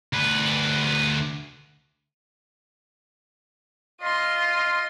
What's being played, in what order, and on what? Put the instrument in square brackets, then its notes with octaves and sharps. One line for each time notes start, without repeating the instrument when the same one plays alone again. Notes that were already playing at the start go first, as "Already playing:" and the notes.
[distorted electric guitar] D2 B4
[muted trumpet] F4 [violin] D#5 C6